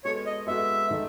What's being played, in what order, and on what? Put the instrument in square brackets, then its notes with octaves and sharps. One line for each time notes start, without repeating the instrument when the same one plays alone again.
[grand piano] G#3 B3 F#4 A4 [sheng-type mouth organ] C#5
[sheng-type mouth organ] D#5
[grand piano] G#3 B3 F#4 A4 [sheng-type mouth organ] E5
[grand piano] D#3 A3 D#4 A4